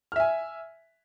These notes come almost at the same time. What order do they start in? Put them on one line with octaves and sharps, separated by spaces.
F6 E5 G#5